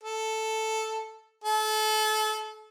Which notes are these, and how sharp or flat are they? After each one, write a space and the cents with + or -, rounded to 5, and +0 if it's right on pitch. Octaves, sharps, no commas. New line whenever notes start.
A4 +0
A4 -30